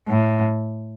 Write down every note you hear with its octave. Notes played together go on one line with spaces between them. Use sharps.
A2